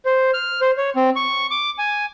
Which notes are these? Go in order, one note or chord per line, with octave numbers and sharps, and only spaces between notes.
C5
F6
C5
C#5
C4
C#6
D6
G#5